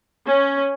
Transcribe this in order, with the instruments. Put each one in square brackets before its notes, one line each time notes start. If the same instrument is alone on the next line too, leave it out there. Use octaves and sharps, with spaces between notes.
[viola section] C#4